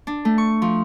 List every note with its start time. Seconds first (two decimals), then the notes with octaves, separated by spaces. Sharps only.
0.07 D4
0.25 A3
0.38 C#6
0.62 F3